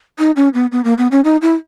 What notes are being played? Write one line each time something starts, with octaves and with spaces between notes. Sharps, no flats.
D#4
C#4
B3
B3
A#3
B3
C#4
D#4
E4